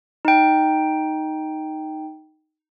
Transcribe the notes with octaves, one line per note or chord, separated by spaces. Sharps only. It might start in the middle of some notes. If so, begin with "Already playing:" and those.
D#4 G5